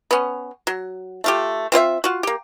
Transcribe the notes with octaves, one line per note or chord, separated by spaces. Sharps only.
B3 C#4
F#3
A3 F4 G4
C4 F4 C5 E5
F4 F#4
A#3 G4